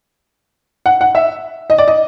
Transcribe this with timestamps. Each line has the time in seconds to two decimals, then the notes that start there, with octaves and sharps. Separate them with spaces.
0.86 F#5
1.01 F#5
1.15 E5
1.70 D#5
1.78 D5
1.88 D#5